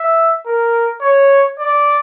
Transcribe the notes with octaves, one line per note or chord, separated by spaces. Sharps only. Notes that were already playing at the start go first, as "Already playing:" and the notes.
Already playing: E5
A#4
C#5
D5